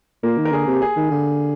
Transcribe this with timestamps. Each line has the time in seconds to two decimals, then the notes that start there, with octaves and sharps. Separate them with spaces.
0.23 A#2 A#3
0.38 D#3
0.45 A#4
0.53 D3 G#4
0.67 C3
0.73 G4
0.82 G#4
0.97 D#3
1.11 D3